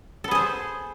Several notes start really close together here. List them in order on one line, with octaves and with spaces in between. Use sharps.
A4 B3 G#4 C5